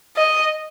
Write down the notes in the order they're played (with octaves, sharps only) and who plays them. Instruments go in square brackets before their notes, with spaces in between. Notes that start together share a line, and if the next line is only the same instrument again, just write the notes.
[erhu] D#5